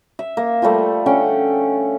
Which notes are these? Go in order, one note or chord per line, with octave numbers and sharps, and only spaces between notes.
E5
A#3
F3 G3 A3
D3 C#4 F#5 G5